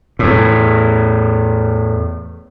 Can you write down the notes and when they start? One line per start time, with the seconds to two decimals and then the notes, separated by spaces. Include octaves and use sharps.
0.19 E2 A2